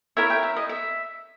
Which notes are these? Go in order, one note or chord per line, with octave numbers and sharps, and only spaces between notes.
E4 A#4 C#5 E5
G5
E5
D#5
E5